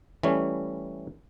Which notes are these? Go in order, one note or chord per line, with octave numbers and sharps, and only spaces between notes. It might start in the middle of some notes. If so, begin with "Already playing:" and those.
E3 G3 A3 C#4